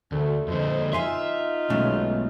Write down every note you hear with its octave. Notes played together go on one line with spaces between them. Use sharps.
D2 A3 A4
F2 D3 C5 D#5
D#4 F4 E5 F5 G#5 C6
B1 G#3 A3 C#4